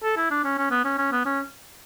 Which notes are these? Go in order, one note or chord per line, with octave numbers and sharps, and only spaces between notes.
A4
E4
D4
C#4
C#4
B3
C#4
C#4
B3
C#4